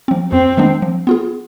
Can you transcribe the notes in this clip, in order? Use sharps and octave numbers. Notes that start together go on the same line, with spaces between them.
F3 C4
F2 C4
D#3 G#3 B3 D4
F3
B3 F4 G#4